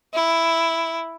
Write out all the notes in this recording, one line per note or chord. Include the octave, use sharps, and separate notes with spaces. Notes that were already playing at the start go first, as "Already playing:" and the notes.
E4